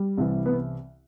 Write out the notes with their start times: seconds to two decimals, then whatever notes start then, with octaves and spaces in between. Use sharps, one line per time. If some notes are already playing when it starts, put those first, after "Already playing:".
Already playing: G3
0.18 C2 C3 E3
0.46 B3